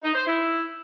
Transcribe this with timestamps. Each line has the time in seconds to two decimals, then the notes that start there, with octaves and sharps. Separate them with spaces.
0.03 D#4
0.15 C5
0.27 E4